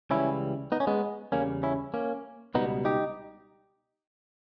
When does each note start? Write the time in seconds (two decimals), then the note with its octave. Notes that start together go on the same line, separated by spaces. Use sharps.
0.10 C#2 C#3 E3 G3 C#4 E4
0.72 B3 D#4
0.80 C#4
0.87 G#3 B3
1.32 E2 C#3 G3 A#3 C#4
1.63 C#4 E4
1.94 A#3 C#4
2.54 C#2 B2 G3 B3 D#4
2.85 D#4 G4